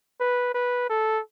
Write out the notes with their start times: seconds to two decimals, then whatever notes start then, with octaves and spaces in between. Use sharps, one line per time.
0.20 B4
0.55 B4
0.90 A4